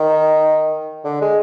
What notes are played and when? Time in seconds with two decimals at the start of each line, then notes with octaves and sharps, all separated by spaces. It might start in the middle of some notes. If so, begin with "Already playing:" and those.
Already playing: D#3
1.05 D3
1.21 G#3